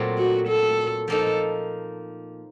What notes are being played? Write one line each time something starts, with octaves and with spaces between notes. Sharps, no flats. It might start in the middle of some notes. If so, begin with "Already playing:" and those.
Already playing: A#2 F#3 A3 C4
F#4
A4
F3 A#3 D#4 A4